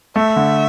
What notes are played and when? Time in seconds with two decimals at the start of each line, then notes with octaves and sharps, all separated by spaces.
0.16 A3 E5
0.36 D3